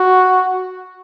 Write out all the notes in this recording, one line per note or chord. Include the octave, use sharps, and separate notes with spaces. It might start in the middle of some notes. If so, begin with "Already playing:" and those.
Already playing: F#4